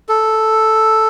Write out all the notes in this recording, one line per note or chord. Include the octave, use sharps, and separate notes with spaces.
A4